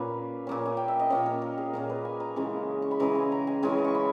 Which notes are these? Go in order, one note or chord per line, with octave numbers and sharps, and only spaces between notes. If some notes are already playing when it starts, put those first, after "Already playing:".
Already playing: A#2 A#3 C#4 B4
A#2 A#3 C#4
G#5
G5
E5
D#5
A#2 A#3 C#4 C#5
A#4
A#4
G#4
A#2 A#3 C#4 A#4
B4
G#5
A#5
C#3 E3 G#3 C#4
C#6
B5
C#3 E3 G#3 C#4 A#5
G#5
A#5
G#5
C#3 E3 G#3 C#4 G#5
C#6
B5